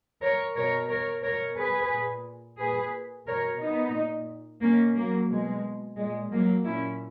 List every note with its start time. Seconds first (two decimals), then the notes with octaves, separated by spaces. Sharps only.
0.21 A#4 C#5
0.55 B2 A#4 C#5
0.89 A#4 C#5
1.23 B2 A#4 C#5
1.57 G#4 B4
1.91 A#2
2.58 A#2 G#4 B4
3.26 B2 A#4 C#5
3.60 B3 D#4
3.95 A#2
4.61 B2 A#3 C#4
4.96 F#3 A#3
5.29 B2 G#3
5.96 A#2 G#3
6.31 F#3 A#3
6.64 A#2 C#4 E4